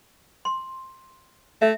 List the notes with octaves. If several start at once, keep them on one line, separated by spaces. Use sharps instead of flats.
C6
A3 E5